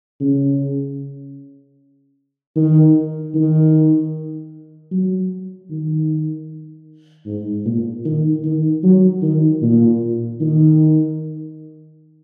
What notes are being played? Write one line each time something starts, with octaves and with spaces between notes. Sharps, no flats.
C#3
D#3
D#3
F#3
D#3
G#2
A#2
D#3
D#3
F#3
D#3
A#2
D#3